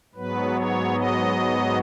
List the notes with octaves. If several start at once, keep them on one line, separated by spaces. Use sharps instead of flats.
G#2 F#3 B3 B4
C#5
D#5